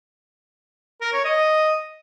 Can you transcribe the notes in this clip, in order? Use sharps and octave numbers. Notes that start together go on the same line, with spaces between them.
A#4
C#5
D#5